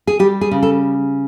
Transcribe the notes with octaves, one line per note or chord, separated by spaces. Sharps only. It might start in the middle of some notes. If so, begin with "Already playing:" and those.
G#4
G3 G4
G#4
C#3
A4